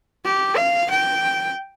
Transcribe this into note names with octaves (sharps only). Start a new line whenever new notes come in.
G4
F5
G5